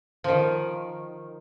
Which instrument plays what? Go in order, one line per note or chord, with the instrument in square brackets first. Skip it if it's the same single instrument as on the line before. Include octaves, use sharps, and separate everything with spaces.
[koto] D#3 F3